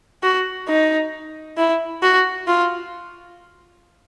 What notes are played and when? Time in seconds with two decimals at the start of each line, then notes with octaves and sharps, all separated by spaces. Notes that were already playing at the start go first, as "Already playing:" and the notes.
0.23 F#4
0.68 D#4
1.58 E4
2.03 F#4
2.47 F4